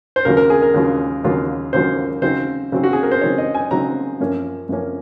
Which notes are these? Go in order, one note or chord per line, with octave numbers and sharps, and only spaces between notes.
C5
D#2 C#3 F#3 A#3 F4 A#4
A#4
G#4
A#4
D#2 C#3 F#3 A#3 F4
D#2 C#3 F#3 A#3 F4
D#2 C#3 F#3 A#3 F4 C5
C#3 F#3 C4 D#4 C5
C#3 F#3 C4 D#4
F#4
G#4
A#4
C5
C#3 F#3 C4 D#4 C#5
D#5
G#5
C#3 F#3 C4 D#4 A#5
F#2 F3 A#3 C#4
F#2 F3 A#3 C#4